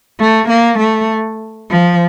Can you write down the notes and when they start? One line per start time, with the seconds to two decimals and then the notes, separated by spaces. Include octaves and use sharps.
0.19 A3
0.49 A#3
0.79 A3
1.70 F3